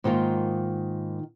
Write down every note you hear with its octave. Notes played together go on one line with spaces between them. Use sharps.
G#2 D#3 A#3 F4 A#4